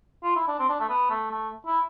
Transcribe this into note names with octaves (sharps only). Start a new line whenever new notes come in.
F4
E4
D4
C4
D4
A3
B3
A3
A3
E4